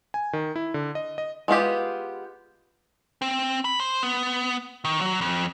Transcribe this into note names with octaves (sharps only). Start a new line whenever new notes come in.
G#5
D#3
E4
D3
D#5
D#5
G#3 B3 F4 G4
C4
B5
C5
B3
D#3
F#3
F2